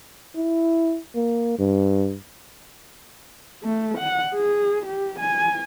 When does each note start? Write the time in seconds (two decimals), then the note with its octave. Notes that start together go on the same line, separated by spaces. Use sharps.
0.36 E4
1.15 A#3
1.59 G2
3.63 A3
3.98 F#5
4.34 G#4
4.86 G4
5.19 G#5